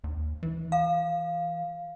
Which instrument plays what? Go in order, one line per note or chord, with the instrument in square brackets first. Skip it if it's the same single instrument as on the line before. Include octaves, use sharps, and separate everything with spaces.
[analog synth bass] D#2
E3
[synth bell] F5